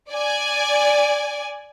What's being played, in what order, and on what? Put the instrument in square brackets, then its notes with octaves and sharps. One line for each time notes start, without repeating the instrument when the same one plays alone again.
[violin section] D5 G#5